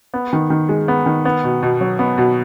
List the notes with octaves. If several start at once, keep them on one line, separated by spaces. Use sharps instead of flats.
B3
D#3
D#3
G#3
B3
D#3
B3
B2
B2
F#3
B3
B2